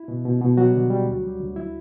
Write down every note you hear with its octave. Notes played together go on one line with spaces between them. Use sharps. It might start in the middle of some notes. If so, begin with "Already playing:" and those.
Already playing: E4
B2
B2
B2
F#3 G3 F#4
D3
G3
D2
G3
D2
E4